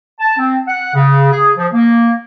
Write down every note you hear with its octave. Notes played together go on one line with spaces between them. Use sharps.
A5
C4
F#5
C#3
G#4
F3
A#3